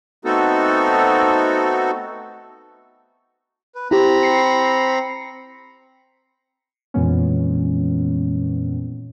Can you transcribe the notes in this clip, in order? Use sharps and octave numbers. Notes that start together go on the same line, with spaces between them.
A3 B3 C4 D#4 F#4 A4
B4
C4 E4 G4 A#5 B5
C7 C#7
F2 A#2 E3 G#3 B3 C#4